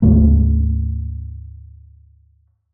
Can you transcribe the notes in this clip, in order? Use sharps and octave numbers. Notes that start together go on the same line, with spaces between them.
D2 G#2 C#3 A3